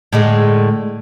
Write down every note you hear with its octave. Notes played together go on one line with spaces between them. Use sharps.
A2 D3 G#3